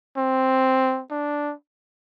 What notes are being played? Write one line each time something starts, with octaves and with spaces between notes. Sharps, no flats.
C4
D4